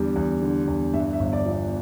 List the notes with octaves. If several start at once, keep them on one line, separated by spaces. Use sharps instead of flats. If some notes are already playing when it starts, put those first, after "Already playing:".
Already playing: E2 D3 G3
E2
D3
E2
G2 E5
E5
G1
D5
F3
D5